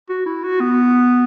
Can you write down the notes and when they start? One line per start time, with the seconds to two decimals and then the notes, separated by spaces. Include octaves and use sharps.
0.09 F#4
0.26 E4
0.44 F#4
0.61 B3